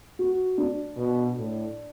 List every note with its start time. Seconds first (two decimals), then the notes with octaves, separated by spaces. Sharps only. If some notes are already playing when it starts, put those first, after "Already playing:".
0.19 F#4
0.58 D4
0.97 B2
1.36 A2